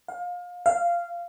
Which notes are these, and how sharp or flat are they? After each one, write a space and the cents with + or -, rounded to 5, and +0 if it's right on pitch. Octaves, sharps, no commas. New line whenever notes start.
F5 +30
F5 -15